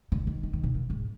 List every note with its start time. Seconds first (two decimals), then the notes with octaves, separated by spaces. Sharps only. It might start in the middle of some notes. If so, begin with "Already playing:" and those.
0.12 C#3
0.27 D#3
0.43 D#3
0.53 D#3
0.64 B2
0.74 A#2
0.90 G#2